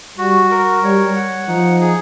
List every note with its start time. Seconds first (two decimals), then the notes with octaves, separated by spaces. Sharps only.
0.18 G3 F#4
0.51 A#4
0.83 G3 C#5
1.16 F#5
1.48 F3 D#4
1.81 G#4